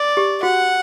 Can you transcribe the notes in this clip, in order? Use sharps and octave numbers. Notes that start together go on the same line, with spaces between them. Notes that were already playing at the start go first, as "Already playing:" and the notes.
Already playing: D5
G4
F#4 F#5